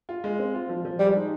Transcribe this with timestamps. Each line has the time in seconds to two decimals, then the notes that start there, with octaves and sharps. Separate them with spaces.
0.09 F4
0.24 G#3
0.39 C4
0.55 F4
0.69 F3
0.85 F3
1.00 G3 G#3
1.15 D#4